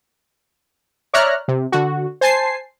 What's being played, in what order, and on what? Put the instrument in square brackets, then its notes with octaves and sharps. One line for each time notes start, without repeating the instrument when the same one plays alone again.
[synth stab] C#5 D5 E5 A#5 F6 F#6
C3
D3 F#4
C5 G#5 A5 C7